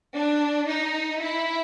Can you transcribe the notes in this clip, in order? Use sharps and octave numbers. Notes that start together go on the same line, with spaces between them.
D4
D#4
E4